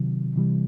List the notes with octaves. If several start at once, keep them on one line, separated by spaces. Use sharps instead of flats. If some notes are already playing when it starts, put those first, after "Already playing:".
Already playing: C3 D#3 F#3
C3 E3 G3